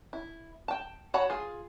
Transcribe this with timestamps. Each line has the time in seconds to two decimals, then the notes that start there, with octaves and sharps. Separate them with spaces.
0.13 E4
0.68 G5 A5
1.14 F#4 C#5 F#5 A5 B5
1.30 F4 G#4